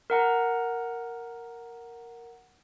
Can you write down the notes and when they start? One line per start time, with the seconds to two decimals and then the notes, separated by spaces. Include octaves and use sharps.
0.10 A#4 F#5 A#5